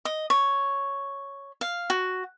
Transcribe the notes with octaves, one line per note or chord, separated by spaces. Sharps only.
D#5
C#5
F5
F#4